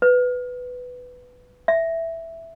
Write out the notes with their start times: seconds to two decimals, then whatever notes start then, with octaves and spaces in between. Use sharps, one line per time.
0.02 B4
1.68 E5